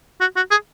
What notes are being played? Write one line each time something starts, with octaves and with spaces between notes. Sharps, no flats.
F#4
F#4
G#4